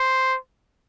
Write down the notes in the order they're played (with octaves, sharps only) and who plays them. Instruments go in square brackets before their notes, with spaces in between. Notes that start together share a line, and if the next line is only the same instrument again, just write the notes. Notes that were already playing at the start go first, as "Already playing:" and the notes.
Already playing: [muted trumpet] C5